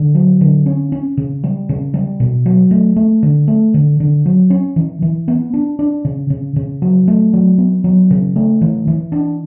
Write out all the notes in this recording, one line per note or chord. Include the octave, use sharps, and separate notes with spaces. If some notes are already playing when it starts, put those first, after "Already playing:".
Already playing: D3
F#3
D3
C#4
C#4
C#3
G3
C#3
G3
B2
F#3
A3
A3
D3
A3
D3
D3
F#3
C#4
E3
E3
B3
D4
D4
C#3
C#3
C#3
F#3
A3
F#3
B3
F#3
C#3
A3
E3
E3
D4